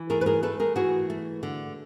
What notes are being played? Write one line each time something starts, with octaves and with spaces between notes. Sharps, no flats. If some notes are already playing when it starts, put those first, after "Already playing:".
Already playing: E3
A3 G#4 A#4
B4
G#4 A#4
A3 A4 B4
G#4 A#4
E3 F#4 G#4
A3
D3